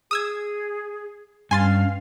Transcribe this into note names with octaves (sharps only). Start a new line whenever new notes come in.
G#4 D#6 E6 G#6
G2 C#4 F5 G#5 C6 A6